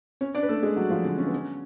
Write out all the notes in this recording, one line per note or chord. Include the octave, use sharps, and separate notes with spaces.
C#4 C#5
D4 D5
B4
A3 A4
G#3 G#4
F#3 F#4
F3 F4
D3 D4
C#4
B3
C#4